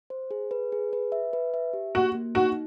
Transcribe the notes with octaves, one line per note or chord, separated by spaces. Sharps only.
C5
G#4
B4
G#4
B4
E5
B4
E5
G4
A#3 F#4
A#3
D#4 F#4